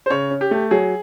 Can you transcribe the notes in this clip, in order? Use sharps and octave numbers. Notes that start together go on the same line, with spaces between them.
C5
C#3 C#5
C#4
G4
A3
F#3 G#4